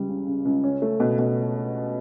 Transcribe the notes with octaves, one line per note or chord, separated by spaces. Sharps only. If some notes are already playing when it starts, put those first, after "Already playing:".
Already playing: C#2 G3
C#3
C#3
C#2
C#4
A3
B2
B2